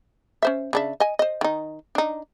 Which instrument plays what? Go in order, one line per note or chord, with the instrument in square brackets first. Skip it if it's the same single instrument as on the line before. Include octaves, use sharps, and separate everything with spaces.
[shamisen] C#4 C5 E5
C#3 D4 E5
D#5 G#5
C5 D#5
D#3 D#4
D4 D#4